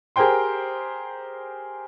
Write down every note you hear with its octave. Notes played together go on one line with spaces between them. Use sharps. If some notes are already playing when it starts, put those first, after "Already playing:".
G4 G#4 A#4 C5 G5 C6